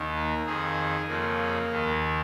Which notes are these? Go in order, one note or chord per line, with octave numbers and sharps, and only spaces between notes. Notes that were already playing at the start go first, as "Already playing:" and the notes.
Already playing: D#2 D#3
A#3
F2 D#3 G#4
F2 C#3 F3 A#3
D#2 D#3